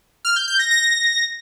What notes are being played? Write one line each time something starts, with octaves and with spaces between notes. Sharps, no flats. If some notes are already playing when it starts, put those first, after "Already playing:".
F6
G6
G6
A#6
A#6